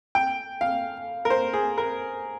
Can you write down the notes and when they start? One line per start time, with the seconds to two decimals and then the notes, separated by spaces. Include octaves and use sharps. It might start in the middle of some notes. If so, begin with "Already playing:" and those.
0.15 G5
0.61 F5
1.25 A#4
1.30 C5
1.53 G#4
1.78 A#4